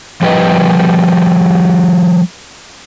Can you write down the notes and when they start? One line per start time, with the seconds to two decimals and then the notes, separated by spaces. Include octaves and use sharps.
0.22 F3 G3 G4 B4 D#5